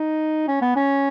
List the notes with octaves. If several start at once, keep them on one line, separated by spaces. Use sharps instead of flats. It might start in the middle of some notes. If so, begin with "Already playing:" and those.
Already playing: D#4
C#4
B3
C#4